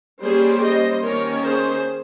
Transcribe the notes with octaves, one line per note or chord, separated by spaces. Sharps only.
G3 A#3 C#4 G#4 C5
C5 D#5
D#3 A#3 C#4 A#4 C#5
G#4 C5